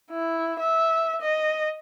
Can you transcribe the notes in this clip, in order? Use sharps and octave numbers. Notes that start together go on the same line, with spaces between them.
E4
E5
D#5